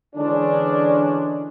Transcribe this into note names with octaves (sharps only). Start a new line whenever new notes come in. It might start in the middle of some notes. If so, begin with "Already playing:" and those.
D3 E3 G#3 C#4 D4